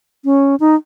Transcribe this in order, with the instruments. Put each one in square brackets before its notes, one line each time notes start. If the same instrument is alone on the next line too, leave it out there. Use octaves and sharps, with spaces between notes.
[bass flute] C#4
D#4